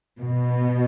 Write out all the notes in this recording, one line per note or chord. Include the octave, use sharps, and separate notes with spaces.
B2